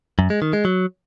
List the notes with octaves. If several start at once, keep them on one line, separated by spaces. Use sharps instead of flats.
F#2
G#3
D#3
G#3
F#3